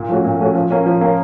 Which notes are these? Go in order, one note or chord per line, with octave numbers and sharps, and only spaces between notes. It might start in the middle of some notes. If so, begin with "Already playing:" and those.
Already playing: A#2
F3 A3 C#4 F#4
A#2
F3 A3 C#4 F#4
F3
A#3 C#4
F3
A#3 C#4